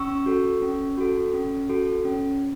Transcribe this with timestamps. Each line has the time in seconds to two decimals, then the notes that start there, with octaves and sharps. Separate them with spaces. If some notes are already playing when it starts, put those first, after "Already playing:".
Already playing: C#4 C#6 E6
0.26 F#4 A4
0.62 C#4
0.97 F#4 A4
1.33 C#4
1.69 F#4 A4
2.05 C#4